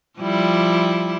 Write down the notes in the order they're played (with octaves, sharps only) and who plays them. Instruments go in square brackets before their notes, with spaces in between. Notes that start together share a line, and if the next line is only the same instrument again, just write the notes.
[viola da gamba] F3 G3 E4